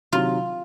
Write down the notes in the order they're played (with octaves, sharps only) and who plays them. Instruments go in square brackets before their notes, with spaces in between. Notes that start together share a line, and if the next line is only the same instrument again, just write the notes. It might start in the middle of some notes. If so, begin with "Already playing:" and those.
[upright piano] C3 D#3 F#3 [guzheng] F4